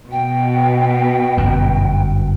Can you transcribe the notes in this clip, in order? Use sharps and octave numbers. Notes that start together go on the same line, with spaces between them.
B2 G5
G1 F#2